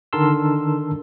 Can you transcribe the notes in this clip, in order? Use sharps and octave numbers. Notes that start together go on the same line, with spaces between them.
D3 D#3 A#4 A5 C6 E6